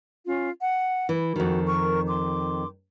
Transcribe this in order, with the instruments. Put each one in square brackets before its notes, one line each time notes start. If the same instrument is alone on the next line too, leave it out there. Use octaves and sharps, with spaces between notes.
[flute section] C#4 F4
F#5
[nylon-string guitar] E3
[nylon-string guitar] F2 D#3 [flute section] F#4
[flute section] A#4 C#6
C6 D6